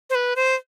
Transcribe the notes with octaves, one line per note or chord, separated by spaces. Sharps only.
C5
B4
C5